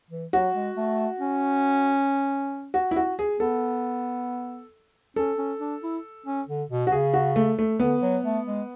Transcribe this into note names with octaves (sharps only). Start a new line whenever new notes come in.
E3
F#3 F#4
G#3
A3
C#4
F#4
E4
F#4
G#4
B3 A4
C#4 A4
C#4
D4
E4
C#4
D3
B2
F#4
C#3 G#4
F#4
A3
A3
D3 B3
F#3
A3
G#3